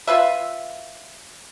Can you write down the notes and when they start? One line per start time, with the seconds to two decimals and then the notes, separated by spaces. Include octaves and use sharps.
0.07 F4 B4 E5